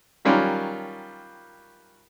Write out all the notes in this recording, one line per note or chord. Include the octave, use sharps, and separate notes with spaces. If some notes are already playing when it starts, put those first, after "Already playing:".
D#3 F#3 G3 C#4 F4 A#4